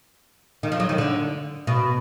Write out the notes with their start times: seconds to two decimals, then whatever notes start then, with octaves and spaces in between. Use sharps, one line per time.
0.63 D#3
0.72 F3
0.80 F#3
0.89 D#3
0.98 D3
1.67 B2